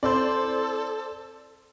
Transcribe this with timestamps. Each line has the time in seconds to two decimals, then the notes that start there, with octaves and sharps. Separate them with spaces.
0.03 C4 E4 A4 C5 D5